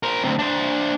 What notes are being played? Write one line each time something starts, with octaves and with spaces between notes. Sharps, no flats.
A#4 C5
D2 C4
D4 C5